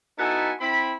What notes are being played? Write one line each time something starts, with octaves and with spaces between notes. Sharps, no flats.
B3 D#4 E4 F#4 A4 G#5
C4 E4 B5